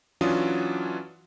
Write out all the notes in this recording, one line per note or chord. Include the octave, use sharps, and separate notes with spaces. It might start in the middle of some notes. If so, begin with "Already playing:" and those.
E3 F#3 C#4 D4 F4 D#6